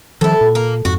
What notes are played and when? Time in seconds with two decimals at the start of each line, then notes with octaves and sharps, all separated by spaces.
0.21 D#3 F3 G3 E4 A4
0.41 A#2
0.55 A#3
0.85 F2 G#2 F#4